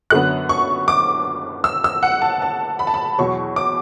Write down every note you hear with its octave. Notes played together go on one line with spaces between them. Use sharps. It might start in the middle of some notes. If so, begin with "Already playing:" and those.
F#2 D3 F#3 B3 F#6
C#6
D6
E6
E6
F#5
A5
A5
B5
A5
B5
E2 B2 F#3 C#6
D6